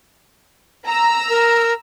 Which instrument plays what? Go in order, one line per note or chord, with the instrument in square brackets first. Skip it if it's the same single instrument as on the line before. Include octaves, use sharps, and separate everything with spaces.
[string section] A#5 E6
[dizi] A#4